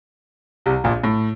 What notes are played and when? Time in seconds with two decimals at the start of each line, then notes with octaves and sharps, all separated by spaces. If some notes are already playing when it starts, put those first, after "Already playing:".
0.66 C2 C3
0.84 A#1 A#2
1.04 A2